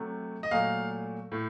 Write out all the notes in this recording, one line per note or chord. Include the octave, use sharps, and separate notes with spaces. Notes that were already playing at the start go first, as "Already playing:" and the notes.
Already playing: C3 F#3 A3
D#5
A#2 F#3 A3 F5
A2 A3